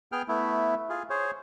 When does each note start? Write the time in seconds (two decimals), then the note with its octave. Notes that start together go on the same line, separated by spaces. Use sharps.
0.12 B3 G#4 G5 F6
0.28 A3 B3 E4
0.89 F4 G#4
1.10 G#4 C5 C#5